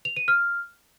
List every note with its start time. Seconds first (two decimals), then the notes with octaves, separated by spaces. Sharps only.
0.05 F7
0.17 D#7
0.28 F6